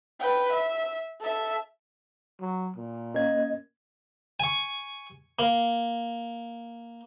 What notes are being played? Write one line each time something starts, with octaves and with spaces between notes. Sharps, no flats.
B4 G5
E5
A4 E5
F#3
A#2
A#3 C#4 D#5 G#6
G#5 C#6
A#3